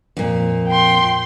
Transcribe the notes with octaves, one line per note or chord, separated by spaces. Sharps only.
F2 A#2
G5 C6